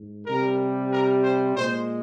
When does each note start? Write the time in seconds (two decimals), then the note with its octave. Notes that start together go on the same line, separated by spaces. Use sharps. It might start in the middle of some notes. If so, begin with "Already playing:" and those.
Already playing: G#2
0.25 C3 G3 A#4
0.91 A#4
1.22 C5
1.55 A#2 G#3 C5